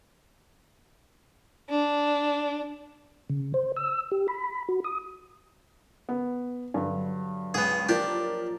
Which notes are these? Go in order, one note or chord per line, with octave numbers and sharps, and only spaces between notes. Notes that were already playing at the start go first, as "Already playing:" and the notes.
D4
C#3
C5
E6
G4
B5
F#4
D#6
B3
G2 D3 F#3 B6
C#2 B3 G#4
F3 A#3 D4 G4 A#4 C#5 D5 A6